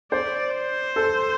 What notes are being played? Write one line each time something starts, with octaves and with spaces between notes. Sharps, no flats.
C5 D5
C5
A4